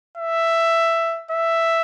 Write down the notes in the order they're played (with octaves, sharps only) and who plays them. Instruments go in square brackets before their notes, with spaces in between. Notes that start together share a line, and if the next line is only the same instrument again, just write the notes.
[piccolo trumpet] E5
E5